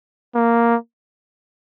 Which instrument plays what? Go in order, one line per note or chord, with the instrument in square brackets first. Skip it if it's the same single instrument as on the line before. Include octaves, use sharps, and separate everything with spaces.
[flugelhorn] A#3